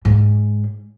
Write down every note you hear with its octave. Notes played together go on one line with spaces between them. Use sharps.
G#2